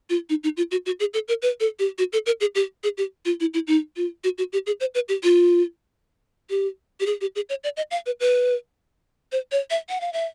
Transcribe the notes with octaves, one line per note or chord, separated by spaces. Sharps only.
F4
D#4
D#4
F4
F#4
F#4
G#4
A4
A#4
B4
A4
G4
F#4
A4
A#4
G#4
G4
G#4
G4
F4
E4
E4
D#4
F4
F#4
F#4
G4
G#4
C5
B4
G4
F4
G4
G4
G#4
G4
G#4
C#5
D5
D#5
F5
B4
B4
C5
C#5
E5
F#5
F5
E5